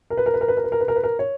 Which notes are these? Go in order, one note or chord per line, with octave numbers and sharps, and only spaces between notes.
A#4
B4
A#4
B4
A#4
B4
A#4
B4
A#4
B4
A#4
B4
A#4
C#5